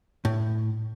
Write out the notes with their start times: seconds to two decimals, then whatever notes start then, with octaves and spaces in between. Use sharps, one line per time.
0.25 A2